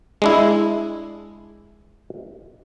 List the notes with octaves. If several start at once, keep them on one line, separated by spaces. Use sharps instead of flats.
G#3 D4 E4